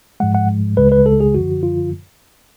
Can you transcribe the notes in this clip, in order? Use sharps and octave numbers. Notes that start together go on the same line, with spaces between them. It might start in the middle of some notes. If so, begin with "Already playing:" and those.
G#2 F3 G#3 F#5
F#5
C#2 C#3 G#3 B4
B4
A4
G#4
F#2 D3 F3 F#4
F4